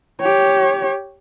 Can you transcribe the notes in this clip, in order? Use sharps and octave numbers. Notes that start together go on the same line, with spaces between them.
G4 C#5